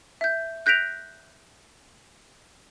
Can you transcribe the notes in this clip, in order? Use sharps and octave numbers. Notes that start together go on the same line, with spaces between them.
E5 G6
F#6 G6 A#6 B6 D7 F7